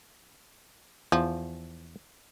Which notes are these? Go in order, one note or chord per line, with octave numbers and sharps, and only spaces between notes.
E2 F3